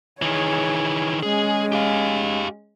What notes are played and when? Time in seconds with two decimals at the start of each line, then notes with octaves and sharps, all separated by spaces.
0.22 D#3 E3 G#4 C#5
1.23 G#3 C#4 G#4
1.72 G4 F5